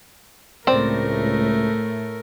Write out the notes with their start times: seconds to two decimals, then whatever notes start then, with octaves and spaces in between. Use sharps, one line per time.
0.67 C#2 A2 A3 C4 A#4 D5